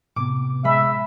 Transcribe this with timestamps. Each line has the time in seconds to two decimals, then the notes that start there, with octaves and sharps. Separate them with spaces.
0.16 A2 C3 B3 D6
0.64 G#3 E5 B5